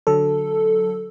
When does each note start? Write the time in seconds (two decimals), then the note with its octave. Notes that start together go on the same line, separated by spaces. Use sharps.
0.07 D3 F#3 A4